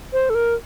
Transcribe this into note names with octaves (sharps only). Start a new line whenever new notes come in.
C5
A4
A#4